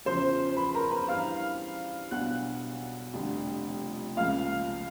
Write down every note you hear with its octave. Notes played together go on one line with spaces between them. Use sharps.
E2 C#3 F3 C5 C6
B4 B5
A#4 A#5
B4 B5
G2 E3 G3 F5 F6
B1 B2 G3 B3 D4 F#5 F#6
F1 F2 D3 G3
C#2 C#3 F3 A#3 F5 F6